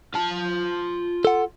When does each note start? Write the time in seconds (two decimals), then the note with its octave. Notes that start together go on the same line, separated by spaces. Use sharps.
0.14 F4 A5
1.25 A4 F#5